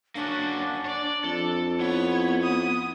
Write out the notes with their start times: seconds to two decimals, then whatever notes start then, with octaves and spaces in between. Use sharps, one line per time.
0.15 A#3 C#4 D4 F#4
0.85 C#5 D5
1.24 F2 A4
1.80 B3 E4 C#5
2.43 D#6